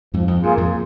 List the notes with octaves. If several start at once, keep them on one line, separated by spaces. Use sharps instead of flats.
F2 G#2 F3
F2
G2 A#3 F4 G#4
F2 G#2